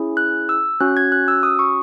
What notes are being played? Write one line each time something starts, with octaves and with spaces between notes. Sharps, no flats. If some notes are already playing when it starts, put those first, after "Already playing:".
Already playing: C#4 E4 G#4
F#6
E6
C#4 F#4 F#6
G#6
F#6
E6
D#6
C#6